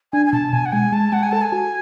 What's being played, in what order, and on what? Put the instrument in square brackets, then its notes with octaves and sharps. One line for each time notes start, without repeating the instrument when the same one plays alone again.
[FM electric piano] D4 [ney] G#5
[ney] G#5
[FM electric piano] B2 [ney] A5
[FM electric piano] B2 [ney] G#5
[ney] F#5
[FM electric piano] G#3 [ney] G#5
[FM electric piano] G#3 [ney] A5
[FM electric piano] G#3 [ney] F#5
[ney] G#5
[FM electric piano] A4 [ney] A5
[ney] G#5
[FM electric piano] F#4